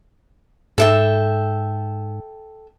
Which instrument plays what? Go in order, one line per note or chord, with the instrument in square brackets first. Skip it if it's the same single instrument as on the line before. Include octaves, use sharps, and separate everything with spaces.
[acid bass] G#2 [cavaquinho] A4 E5 G5